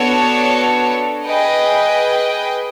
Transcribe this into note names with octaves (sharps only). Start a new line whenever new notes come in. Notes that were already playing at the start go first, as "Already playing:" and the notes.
Already playing: B3 D4 F#4 A4 C#5
G#4 B4 D#5 G5